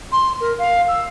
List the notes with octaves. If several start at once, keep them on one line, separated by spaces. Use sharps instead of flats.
C6
A#4
F5
E6